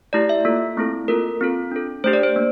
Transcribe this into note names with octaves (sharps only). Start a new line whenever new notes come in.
A3 E4 G4 D5
E5
A#3 F4 A4
A3 C4 E4 A4
A#3 F4 A4 A#4
C4 F4 A4
D4 A4
A3 D4 G4 C5
D5
C5
A#3